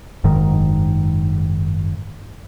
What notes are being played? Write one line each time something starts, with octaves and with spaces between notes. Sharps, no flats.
F#1 G#2 D#3